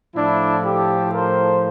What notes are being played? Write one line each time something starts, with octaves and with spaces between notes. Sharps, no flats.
A2 F3 D4 E4
G4 A4
A#4 C5